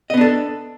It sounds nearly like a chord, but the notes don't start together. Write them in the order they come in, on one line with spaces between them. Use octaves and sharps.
D#5 B3 D4 A4